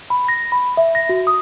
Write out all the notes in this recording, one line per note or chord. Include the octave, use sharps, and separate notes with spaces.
B5
A#6
B5
E5
A#6
F#4
D#6